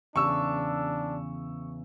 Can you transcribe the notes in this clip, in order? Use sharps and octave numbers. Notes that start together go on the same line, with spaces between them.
E2 C#3 D4 C#6 E6